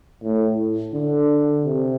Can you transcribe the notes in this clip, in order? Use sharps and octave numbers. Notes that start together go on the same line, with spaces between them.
A2
D3
C3